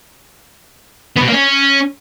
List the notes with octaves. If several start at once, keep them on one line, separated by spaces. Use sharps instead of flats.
B3
B2
A#3
C#4